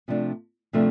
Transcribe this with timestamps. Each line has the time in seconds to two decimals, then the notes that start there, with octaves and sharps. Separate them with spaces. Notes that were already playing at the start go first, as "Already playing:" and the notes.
0.08 C3 F3 A3 D4 F4
0.73 C3 F3 A3 D4